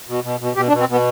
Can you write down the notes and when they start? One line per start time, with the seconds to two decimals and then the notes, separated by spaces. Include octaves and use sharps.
0.09 B2
0.24 B2
0.40 B2
0.56 B2 G4
0.68 D4
0.72 B2
0.80 C4
0.89 B2 B3